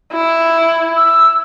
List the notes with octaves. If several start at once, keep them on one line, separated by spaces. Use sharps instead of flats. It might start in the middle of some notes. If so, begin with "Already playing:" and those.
E4
E6